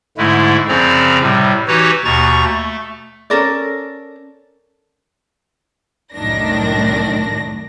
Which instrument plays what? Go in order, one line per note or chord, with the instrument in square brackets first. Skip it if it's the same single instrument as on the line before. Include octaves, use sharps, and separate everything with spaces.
[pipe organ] G#2 D3 G#3 A3 E4
F#2 C#3 F3 C4 D5 A#5
A2 C3 G3
E3 D#4 F#4 G4 B4 C#5
D#2 B2 A#5 C#6 A6
A3
[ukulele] C#4 A4 A#4 D5
[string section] C2 F#2 A2 D#3 D4 A#6